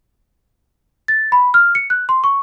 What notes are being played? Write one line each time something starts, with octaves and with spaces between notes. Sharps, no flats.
A6
B5
F6
C#7
F#6
C6
C#6